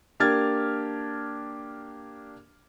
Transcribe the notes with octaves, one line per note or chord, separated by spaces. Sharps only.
A#3 D4 G4 F6 G#6 A6